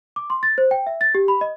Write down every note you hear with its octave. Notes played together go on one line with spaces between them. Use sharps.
D6
C6
A6
C5
G5
E5
A6
G4
B5
D#5